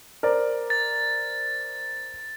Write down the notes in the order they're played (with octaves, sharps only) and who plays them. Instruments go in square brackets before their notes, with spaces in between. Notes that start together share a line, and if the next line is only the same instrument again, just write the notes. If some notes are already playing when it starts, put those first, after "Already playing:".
[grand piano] A#4 C5 D5
[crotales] A6